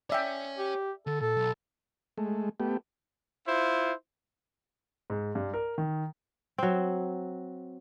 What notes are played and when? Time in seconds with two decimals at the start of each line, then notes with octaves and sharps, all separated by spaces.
0.10 C#5 D5 E5 G5 G#5
0.58 G4
1.07 D3 A4
1.21 A#2 A4
1.37 B1
2.18 G#3 A3
2.60 A3 B3 G4
3.47 E4 F4 C5
5.10 G#2
5.35 G2
5.54 A#4
5.78 D#3
6.58 F#3 C4